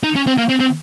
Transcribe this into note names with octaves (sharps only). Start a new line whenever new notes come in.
D#4
C#4
C4
A#3
C4
C4